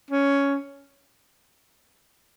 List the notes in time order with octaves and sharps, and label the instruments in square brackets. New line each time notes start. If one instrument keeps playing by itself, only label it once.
[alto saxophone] C#4